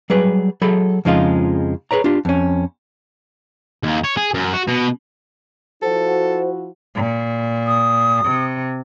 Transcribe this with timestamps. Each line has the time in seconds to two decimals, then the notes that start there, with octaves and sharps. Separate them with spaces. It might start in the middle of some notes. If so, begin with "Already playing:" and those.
0.10 F#3 G3 G#4 B4
0.62 F#3 G#4 A4 B5
1.05 F2 C#3 F3 G#3 D#4 F4
1.91 G#4 B4 C#5 A#5
2.04 D4 F4 G4
2.25 F2 C#4
3.83 D#2
4.04 C#5
4.17 G#4
4.34 F#2
4.54 F#4
4.68 B2
5.82 F3 E4 F#4 A4 C5
6.95 A#2
7.67 D#6
8.25 C3